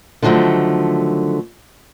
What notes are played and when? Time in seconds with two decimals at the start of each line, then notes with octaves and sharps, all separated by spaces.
0.22 D3 D#3 F3 F#3 A3